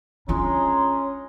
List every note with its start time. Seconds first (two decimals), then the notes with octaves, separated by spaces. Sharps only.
0.28 G#3 C#4 D4 F4 A#5 C6